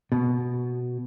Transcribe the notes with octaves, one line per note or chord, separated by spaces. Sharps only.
B2